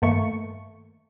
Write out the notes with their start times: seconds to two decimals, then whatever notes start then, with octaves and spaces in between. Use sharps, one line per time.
0.02 G2 D#3 A3 A#3 C#6